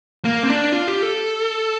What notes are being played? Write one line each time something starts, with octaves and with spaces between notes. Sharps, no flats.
A#3
C4
D4
F4
G4
A4